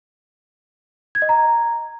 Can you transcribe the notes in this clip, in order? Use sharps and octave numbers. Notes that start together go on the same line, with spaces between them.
G#6
D#5
A#5